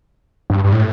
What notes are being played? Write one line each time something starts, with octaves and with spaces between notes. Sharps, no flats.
G2
G2
A2